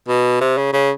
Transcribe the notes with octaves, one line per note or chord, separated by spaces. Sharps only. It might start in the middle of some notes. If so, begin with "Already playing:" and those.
B2
C3
C#3
C#3